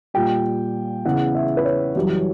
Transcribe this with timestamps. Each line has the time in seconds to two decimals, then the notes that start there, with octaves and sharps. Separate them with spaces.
0.14 A#2 G3 G5
1.05 E2 C#3 E3 F#5
1.35 E5
1.57 B4
1.65 C#5
1.95 F#2 E3 G3